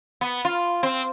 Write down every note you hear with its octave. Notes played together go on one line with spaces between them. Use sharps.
B3
F4
C4